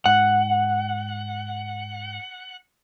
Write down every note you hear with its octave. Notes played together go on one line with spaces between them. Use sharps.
G#2 F#5